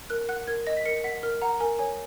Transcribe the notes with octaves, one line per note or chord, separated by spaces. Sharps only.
A#4 F#6
F#5 F#6
A#4 G#6
D#5 A#6
B6
A#4 C#7
F#5 B6
A#4 F6
F#5 A#5
A#4 G#5
C#5 G#5